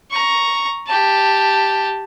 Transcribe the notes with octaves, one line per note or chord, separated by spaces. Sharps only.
A#5 C#6
G4 A5